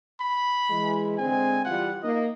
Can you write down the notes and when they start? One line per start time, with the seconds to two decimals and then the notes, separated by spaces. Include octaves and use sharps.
0.21 B5
0.70 E3 G#3
1.18 D3 G#3 C4 G#5
1.65 E3 G3 F4 F#5
2.02 A#3 D#4 D#5